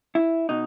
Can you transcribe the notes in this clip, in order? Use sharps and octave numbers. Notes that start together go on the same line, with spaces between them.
E4
B2 D#4